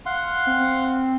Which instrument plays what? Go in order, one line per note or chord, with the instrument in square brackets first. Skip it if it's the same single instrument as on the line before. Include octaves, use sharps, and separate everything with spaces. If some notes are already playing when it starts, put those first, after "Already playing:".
[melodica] F5 F#5 C6
[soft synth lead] C4